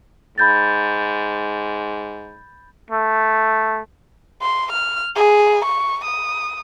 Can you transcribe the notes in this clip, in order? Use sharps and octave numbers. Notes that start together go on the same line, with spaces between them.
G#2 B5 G6 A6
A3
C6
F6
G#4
C#6
D#6